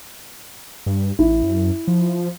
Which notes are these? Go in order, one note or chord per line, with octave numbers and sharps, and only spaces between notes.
G2
A1 E4
F#2
F3